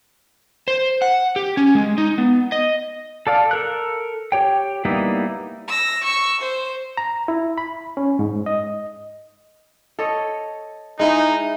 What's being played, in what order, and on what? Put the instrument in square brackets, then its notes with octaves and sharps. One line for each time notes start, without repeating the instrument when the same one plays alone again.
[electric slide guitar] C5
F#5
G4
C#4
G#3
D#4
B3
D#5
[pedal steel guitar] A4 D5 F5
A4 A#4 F#6
G4 C#5 G5
G3 A#3 B3 D#4 E4
[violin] E6 A#6
C#6 E6
C5
[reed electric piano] A#5
E4
B5
C#4
G#2
D#5
[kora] A4 C#5 D#5
[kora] G#3 E4 G#4 [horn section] D#4